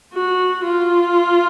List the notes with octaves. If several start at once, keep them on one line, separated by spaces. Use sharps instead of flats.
F#4
F4